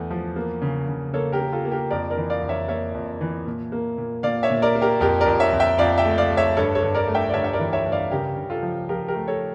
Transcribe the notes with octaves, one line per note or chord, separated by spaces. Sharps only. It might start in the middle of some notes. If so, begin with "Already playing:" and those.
Already playing: E2 A3
F3
A#3
C#3
C#3
A#3 A4 C#5
G4 A#4
A#3
F4 A4
A#3
G4 A#4
F2 A#4 D5
A#4 D5
E3
D5 F5
F2
C#5 E5
A#3 C#5 E5
F2
E3
A#2
A#3
A#2
A#2 D5 F5
C#5 E5
A#2
A#4 D5
A#3
G4 A#4
F2 G4 A#4
A#4 D5
F2
C#5 E5
F2
E5 G5
F2 D5 F5
E5 G5
A3
D5 F5
A3
C#5 E5
G2 A4 C#5
A4 C#5
G2
A#4 D5
A3
E5 G5
D5
G2 C#5 E5
E5
A#4 D5
E3
C#5 E5
G2
D5 F5
C#3 G4 A#4
C#3
F4 A4
F3
F3 G4 A#4
G4 A#4
A3
A4 C#5